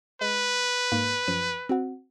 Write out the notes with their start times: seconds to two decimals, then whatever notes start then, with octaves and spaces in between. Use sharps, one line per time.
0.21 G#3 B4
0.92 G#2 A#3
1.28 F#2 F3 D#7
1.69 C4 F#4 F#5